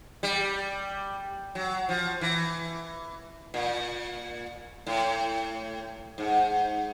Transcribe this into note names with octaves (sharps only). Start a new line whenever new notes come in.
G3
F#3
F3
E3
A#2
A2
G#2